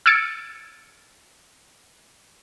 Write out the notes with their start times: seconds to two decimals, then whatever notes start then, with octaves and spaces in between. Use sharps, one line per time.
0.06 E6 F6 G#6 A6 C#7 D7